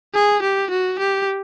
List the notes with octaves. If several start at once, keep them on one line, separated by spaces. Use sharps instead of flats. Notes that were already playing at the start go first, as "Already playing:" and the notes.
G#4
G4
F#4
G4